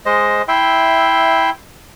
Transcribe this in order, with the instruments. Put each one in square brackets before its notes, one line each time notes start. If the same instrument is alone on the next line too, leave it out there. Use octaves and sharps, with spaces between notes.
[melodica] G#3 C5 D#5
E4 E5 G5 C6